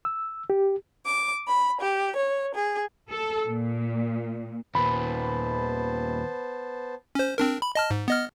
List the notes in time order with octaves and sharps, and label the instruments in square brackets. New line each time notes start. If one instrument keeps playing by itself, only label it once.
[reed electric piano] E6
G4
[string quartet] D6
B5
G4
C#5
G#4
[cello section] A4
A#2
[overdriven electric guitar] D#2 A#2 [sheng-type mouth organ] B3 C5 A5 [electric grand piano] B5
[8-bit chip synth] C#4 C5
C4 D4 A#4
B5
D#5 A5 F6
G#2
B3 D#5 F6